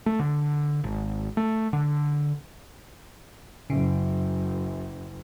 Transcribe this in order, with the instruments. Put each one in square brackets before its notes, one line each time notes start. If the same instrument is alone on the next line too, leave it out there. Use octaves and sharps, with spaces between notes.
[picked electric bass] A3
D3
G#1
A3
D3
[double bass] F#1 F#2 [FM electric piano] C#3